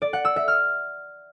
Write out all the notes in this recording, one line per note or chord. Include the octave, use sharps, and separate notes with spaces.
D5
F#5
E6
E5
F6